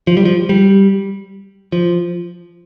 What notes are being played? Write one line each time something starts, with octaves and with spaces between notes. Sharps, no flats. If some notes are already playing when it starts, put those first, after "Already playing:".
F3
G3
F3
G3
F3